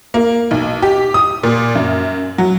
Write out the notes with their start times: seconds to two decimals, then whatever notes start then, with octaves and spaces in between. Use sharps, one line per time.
0.14 A#3
0.51 B1
0.82 G4
1.14 D#6
1.43 A#2
1.75 F#2
2.38 F#3